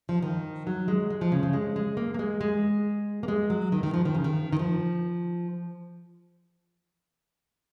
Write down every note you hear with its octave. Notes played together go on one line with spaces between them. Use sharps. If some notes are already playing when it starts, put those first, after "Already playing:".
F3
D#3
F#3
G#3
G#3
F3
C#3
C#3
G#3
G#3
A#3
A#3
G#3
G#3
A#3
G#3
F#3
D#3
D#3
F3
D#3
C#3
D#3
D#3
F3